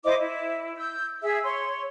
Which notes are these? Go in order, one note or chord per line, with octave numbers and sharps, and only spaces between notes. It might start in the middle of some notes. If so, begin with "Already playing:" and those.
E4 C5 D#5 D6
E4
E6 G6
G#4 E5 E6
C#5 C6